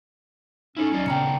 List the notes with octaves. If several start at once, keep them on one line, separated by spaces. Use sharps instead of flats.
C#4 D#4 E4 A4
F#3 D#4 F4 D5
A#2 C#3 B3 D4 G5 A#5 C#7